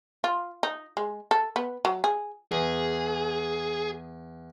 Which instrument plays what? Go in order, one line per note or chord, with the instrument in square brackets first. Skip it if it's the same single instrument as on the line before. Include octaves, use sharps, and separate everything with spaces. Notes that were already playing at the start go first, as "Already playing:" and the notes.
[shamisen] F4
D#4
G#3
A4
B3
F#3
G#4
[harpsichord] E2 [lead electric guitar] G#4